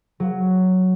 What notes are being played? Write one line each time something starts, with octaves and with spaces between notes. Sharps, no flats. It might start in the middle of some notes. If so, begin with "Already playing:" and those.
F#3